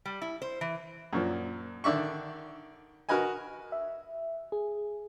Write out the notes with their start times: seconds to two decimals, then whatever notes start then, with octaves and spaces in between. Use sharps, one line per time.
0.05 G3
0.22 E4
0.42 C5
0.61 E3
1.13 F#2 A#2 F3
1.84 D3 D#3 D5 E5 C#6
3.09 F#4 A#4 B4 D#5 G#5
3.72 E5
4.52 G#4